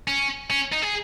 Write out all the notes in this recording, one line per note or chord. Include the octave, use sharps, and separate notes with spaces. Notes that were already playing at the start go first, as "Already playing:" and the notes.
C#4
C#4
D#4
G#4